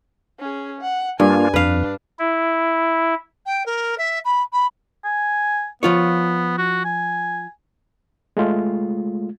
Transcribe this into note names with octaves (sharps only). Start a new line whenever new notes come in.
C#4 G#4
F#5
G2 A#3 D4 F4 G#5
F2 D4 B4 F5
E4
G5
A#4
E5
B5
B5
G#5
F3 B3 F4 C#5
F#4
G#5
G#3 A3 F4